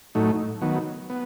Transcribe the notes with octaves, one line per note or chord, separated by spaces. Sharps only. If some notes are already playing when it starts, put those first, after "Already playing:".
A2 F#3 A3 D#4
D#3 F#3 B3
B3